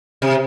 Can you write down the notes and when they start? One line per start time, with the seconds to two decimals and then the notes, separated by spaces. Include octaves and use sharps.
0.22 C3